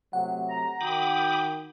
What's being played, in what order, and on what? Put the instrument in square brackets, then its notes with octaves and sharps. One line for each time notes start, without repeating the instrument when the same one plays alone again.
[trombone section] C3 F#3 A3 [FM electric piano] F#5
[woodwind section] A#5
[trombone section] D#3 [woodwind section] F#4 G5 [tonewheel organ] B5 D6 D#6